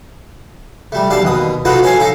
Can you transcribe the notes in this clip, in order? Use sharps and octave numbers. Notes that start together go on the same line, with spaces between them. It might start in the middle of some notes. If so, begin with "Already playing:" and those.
G3 A3
B1 G3 D5 F5 A5
D#2 B2 D#6
D#4 F4 F#4 A4 B4 D#5
C#4 A4 C#5 F5 G#5
D#4 A4 F5 A#5